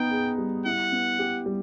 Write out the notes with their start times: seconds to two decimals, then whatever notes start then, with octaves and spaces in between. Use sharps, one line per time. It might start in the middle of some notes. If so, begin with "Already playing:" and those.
Already playing: B3 D#4 G5
0.11 G#4
0.38 G3
0.66 E4 F#5
0.92 B3
1.19 G4
1.46 G3